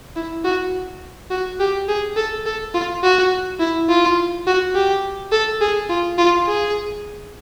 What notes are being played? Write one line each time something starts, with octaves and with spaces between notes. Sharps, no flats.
E4
F#4
F#4
G4
G#4
A4
A4
F4
F#4
E4
F4
F#4
G4
A4
G#4
F4
F4
G#4